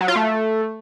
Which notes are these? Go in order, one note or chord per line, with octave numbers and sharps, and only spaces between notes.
F#3
F4
A3